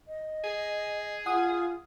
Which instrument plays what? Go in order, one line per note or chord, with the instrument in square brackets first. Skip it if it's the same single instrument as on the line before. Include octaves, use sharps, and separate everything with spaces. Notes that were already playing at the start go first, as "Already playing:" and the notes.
[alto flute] D#5
[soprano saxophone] G#4
[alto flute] F4 [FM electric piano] F#5 D#6